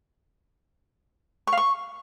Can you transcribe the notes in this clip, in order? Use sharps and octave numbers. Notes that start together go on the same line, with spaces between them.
C#6
F5
C#6